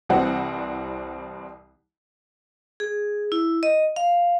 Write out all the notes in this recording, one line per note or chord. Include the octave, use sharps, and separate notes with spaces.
C2 E3 G3 C4 F#5
G#4
E4
D#5
F5